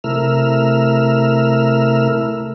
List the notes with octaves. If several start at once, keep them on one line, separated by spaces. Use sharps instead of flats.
C3 A3 E4 A#4 E6 F6